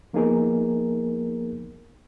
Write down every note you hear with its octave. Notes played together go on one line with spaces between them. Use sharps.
F3 A#3 B3 D#4 G#4 A#4